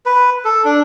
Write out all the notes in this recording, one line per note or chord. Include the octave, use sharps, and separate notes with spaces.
B4
A4
D4